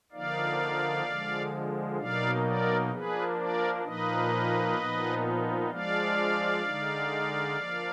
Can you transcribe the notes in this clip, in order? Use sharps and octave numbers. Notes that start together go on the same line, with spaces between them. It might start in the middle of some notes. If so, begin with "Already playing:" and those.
D3 F3 A#3 D#4 D5 F5
D3 F3 G#3
B2 F#3 A#3 D#4 D5 F5
A#4 D5
F3 A#3 D4 G#4 B4
A#4 D5
A#2 F3 A#3 D#4 B4 D#5
A#2 F3 B3 D#4
F3 G#3 D4 D5 F5
D3 G#3 D#4
F3 A#3 D4